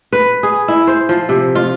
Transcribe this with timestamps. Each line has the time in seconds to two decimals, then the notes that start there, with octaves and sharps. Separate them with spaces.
0.13 B4
0.43 G#4
0.68 E4
0.87 C5
1.09 F3
1.29 C3
1.55 F4